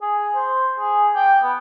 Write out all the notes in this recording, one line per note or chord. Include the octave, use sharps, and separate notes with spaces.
G#4
C5
G#4
G5
B3